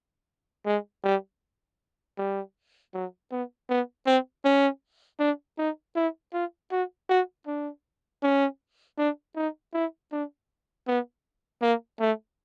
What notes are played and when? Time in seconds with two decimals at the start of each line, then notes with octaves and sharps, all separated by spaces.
0.66 G#3
1.04 G3
2.18 G3
2.94 F#3
3.31 B3
3.69 B3
4.06 C4
4.45 C#4
5.20 D4
5.58 D#4
5.96 E4
6.34 F4
6.72 F#4
7.10 F#4
7.47 D4
8.23 C#4
8.98 D4
9.36 D#4
9.74 E4
10.12 D4
10.88 B3
11.62 A#3
12.01 A3